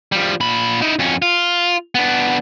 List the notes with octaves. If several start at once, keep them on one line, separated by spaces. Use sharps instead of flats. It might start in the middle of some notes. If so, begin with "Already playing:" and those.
F3 G3
A#2 B5
D#4 E4
F2 C#4
F4
B3 D4